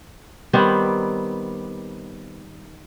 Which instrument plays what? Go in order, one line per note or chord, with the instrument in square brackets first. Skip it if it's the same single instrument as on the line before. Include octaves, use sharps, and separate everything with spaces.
[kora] D#3 G3 B3 C4